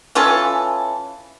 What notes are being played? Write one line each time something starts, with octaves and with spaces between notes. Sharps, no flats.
E3 C#4 F4 A4